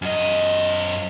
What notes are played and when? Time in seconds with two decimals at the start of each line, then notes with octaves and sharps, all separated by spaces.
0.02 F#2 D#5